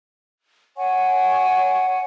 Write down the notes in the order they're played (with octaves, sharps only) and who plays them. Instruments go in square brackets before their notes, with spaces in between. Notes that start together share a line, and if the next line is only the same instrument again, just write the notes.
[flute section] C#5 F#5 G#5 C#6